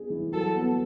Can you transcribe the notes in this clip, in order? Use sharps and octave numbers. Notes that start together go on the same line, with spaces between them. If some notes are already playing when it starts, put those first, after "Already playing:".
Already playing: B3 D4 G#4
E3
F#3 A4
B3